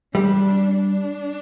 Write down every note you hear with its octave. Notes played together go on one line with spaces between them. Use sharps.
G3 D4
D4